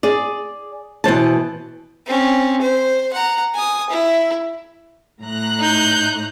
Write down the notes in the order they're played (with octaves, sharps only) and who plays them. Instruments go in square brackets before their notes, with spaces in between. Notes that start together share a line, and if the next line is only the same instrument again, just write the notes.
[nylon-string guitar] G#4 D5
B2 E3 C5 A5
[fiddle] C4 C#4
C5
F#5 A#5
G#5 D#6
E4
[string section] A2 A#5 F#6
[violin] D#4 G6